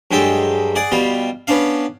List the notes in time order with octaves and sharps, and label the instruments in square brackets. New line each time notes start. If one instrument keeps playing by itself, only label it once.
[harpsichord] G2 F#3 G#3 G4 A4
G#4 D5 F#5
B2 G3 F4
B3 C#4 D4 F5